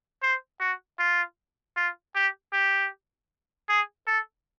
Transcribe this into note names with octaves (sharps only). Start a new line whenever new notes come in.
C5
F#4
F4
F4
G4
G4
G#4
A4